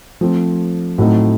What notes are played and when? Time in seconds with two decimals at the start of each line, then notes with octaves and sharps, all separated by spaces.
0.21 F3 A3 C4
0.98 A2 F#3 A3 C4 D#4